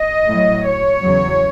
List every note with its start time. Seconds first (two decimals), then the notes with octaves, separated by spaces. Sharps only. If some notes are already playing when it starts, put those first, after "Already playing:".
Already playing: D#5
0.27 A2 F#3
0.65 C#5
1.01 E2 C#3 F#3